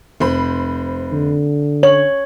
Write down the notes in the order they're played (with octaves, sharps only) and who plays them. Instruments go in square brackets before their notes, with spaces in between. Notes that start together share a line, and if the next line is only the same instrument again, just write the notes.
[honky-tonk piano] F1 C5 B5
[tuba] D3
[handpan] C#5 [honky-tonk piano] F#7